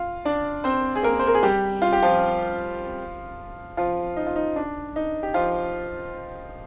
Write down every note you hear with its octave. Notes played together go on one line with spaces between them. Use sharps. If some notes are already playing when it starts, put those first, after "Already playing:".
Already playing: F4 F5
D4 D5
C4 C5
G#4
A#3 A#4
C5
A#4
G#4
G3 G4
F4
G4
F3 F4
F3 F4
D#4
F4
D#4
D4
D#4
G4
F3 F4